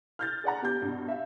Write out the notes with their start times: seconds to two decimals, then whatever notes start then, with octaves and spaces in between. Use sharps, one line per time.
0.19 F6 G6 A6
0.44 G#4 D5 F#5 A#5
0.62 B3 G4 G6
0.82 G2 B2
1.08 E5 F5